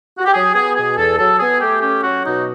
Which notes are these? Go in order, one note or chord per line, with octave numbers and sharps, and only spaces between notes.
F#4
G4
F#3 G#4
B3 G#4
B2 G#4
E2 A4
F#3 A4
B3 G#4
A3 G4
C#4 G4
F#3 F#4
B2 D#4